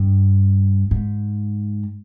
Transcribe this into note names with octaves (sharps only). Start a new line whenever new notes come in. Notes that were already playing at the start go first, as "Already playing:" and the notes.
Already playing: G2
G#2